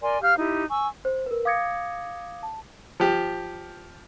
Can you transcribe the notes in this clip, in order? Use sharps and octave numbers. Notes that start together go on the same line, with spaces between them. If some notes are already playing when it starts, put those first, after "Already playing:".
A#4 D5 G#5 C6
G4 F5 F6 G6
D#4 E4 G4
G#5 C#6 E6
C5
A#4 B4
F5 D6 D#6 G#6 A#6 C#7
A5
F3 G4